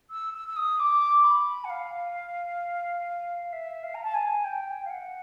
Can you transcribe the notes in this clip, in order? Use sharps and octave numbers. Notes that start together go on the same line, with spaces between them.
E6
E6
E6
D#6
D6
B5
F#5
F5
E5
F5
A#5
A5
G#5
G5
F5
F#5